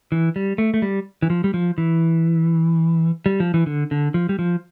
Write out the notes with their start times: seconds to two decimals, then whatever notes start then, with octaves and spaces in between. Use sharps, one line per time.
0.12 E3
0.36 G3
0.58 A3
0.74 A3
0.82 G3
1.22 E3
1.30 F3
1.44 G3
1.54 F3
1.78 E3
3.26 G3
3.40 F3
3.54 E3
3.66 D3
3.91 D3
4.14 F3
4.29 G3
4.39 F3